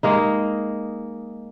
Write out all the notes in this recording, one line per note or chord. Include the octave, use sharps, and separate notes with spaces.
G#3 A#3 D#4